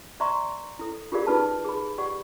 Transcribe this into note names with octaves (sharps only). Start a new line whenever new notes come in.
D5 E5 A#5 C6 C#6
E4 A4
F4 G4 G#4 A#4 D5 F5
D#4 F4 B4 A5
G#4 B5
G4 D5 F#5 C#6